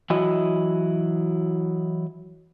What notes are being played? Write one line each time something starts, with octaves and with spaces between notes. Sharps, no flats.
E3 F#3 E4 F#4 D#5